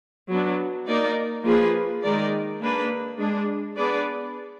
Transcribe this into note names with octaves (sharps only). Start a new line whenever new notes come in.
F#3 B3 D4
A#3 D#4 A#4 D5
F3 A#3 F4 G#4 B4
D#3 G#3 D#4 A#4 D5
A#3 D4 G#4 B4
G#3 D4 G#4
B3 D4 G#4 B4 D5